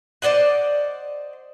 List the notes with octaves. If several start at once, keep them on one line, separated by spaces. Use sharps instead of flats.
C5 D5 D#5 F#5